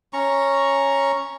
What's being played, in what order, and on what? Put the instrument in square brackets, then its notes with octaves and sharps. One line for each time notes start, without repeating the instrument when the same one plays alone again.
[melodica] C#4 A#5 C#6